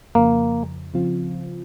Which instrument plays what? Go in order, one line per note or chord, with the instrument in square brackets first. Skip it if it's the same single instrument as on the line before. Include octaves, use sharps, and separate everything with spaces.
[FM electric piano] F2 C#3 F3 [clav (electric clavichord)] A#3
[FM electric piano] C#3 F3 C4 F4